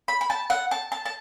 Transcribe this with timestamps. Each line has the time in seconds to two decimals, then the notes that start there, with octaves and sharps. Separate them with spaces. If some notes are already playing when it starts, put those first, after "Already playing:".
0.08 B5
0.21 B5
0.30 A5
0.50 F#5
0.71 A5
0.92 A5
1.06 A5